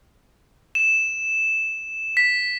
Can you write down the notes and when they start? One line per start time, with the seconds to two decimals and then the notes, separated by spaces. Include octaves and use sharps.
0.75 E7
2.17 B6